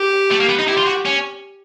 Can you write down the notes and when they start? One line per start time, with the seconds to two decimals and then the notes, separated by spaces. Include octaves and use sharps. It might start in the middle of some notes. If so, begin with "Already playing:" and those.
Already playing: G4
0.31 A3
0.40 A#3
0.49 B3
0.59 D#4
0.68 E4 G4
0.78 F4
0.87 F#4
1.06 C#4